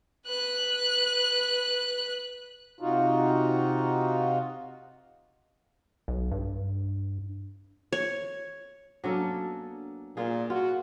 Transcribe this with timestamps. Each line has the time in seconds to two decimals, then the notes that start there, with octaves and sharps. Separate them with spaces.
0.27 B4 F#6
2.80 C3 D#4 F4 F#4
6.08 B1
6.32 G2
7.92 C#5
9.04 F#3 A#3 B3 C#4 D4 A4
10.17 A#2 F4 G#4
10.50 F4 F#4